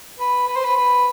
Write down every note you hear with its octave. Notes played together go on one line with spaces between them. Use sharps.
B4
B4
C5
B4
B4